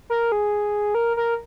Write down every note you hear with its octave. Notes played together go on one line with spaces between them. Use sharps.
A#4
G#4
A#4
A#4